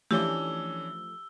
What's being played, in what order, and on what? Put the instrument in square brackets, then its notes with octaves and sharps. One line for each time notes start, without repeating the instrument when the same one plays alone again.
[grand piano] E3 C#4 D4 [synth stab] F3 A3 [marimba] G4 [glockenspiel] E6 G7